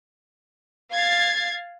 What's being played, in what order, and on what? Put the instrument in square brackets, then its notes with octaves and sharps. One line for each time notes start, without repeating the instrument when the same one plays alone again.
[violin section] F5 G#6 A6 C7